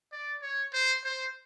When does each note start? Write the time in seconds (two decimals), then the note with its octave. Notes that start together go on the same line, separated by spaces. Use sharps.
0.12 D5
0.42 C#5
0.73 C5
1.04 C5